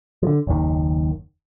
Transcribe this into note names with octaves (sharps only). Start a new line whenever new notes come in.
D3 F3
F#1 D#2 D#3